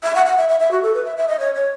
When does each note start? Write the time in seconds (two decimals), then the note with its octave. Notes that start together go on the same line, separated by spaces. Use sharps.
0.03 E5
0.15 F#5
0.26 F#5
0.37 E5
0.49 E5
0.60 E5
0.71 F#4
0.82 A4
0.94 B4
1.05 E5
1.17 E5
1.28 D#5
1.39 C#5
1.55 C#5